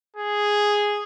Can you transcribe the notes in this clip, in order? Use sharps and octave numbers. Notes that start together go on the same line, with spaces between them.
G#4